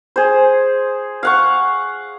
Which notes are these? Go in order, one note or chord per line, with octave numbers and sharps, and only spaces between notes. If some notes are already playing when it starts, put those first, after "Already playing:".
G#4 C5
F5 F#5 C#6